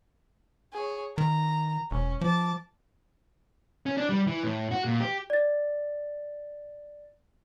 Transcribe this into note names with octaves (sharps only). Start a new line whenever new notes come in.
G#4 C#5
D#3 A#5
E1 C#4
F3 A5 D6
C#4
D4
G3
E3
A2
F#4
A#2
G4
D5 A6